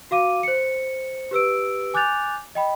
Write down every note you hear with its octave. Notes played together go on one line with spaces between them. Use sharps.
F#4 F5 D6 D#7
C5 C#7
G4 B4 E6 D7
G#5 D6 F#6 G6 A6 F7
D#5 G5 B5